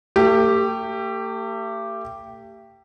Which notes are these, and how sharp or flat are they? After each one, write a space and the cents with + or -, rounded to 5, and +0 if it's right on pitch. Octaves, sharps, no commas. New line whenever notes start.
A3 +40 G4 +0